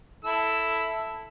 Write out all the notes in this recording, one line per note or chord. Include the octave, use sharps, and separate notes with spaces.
E4 A4 E6